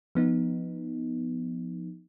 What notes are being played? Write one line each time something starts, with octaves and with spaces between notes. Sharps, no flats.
F3 B3 D#4